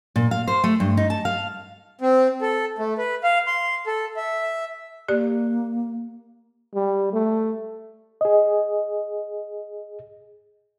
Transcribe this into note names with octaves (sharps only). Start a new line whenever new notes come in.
A#2
F5
C5
A3
G2
D#4
A5
F5
C4
A4
A3
B4
F5
C6
A4
E5
A#3 G4 D5
G3
A3
G#4 D#5